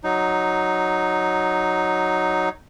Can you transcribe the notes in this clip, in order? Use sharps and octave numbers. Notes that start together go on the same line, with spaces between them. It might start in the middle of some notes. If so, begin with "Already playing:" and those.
F#3 D#4